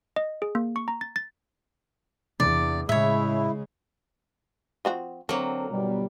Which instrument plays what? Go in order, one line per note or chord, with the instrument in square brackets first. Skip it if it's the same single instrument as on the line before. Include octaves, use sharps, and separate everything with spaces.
[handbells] D#5
G#4
A#3
C#6
A#5
A6
A6
[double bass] E2 [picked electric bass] C3 E3 D4 [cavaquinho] D5
[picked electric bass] A2 [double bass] C#3 G#3 [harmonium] E4 [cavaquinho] C#5 E5
[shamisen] F3 C4 F#4
[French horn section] D3 C4 A4 [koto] F#3 A#3 [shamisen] A#4
[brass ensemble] G1 G3 [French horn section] B2